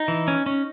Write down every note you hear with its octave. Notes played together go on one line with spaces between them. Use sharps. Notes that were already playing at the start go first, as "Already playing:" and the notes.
Already playing: D#4
E3
C#4
C#4